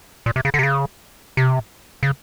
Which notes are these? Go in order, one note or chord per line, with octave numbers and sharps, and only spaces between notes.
A#2
C3
C#3
D3
C3
C#3
C3
C#3